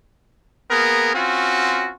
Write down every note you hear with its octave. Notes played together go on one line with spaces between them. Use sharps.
A#3 B3 G#4 A#4
C4 C#4 F4 F#4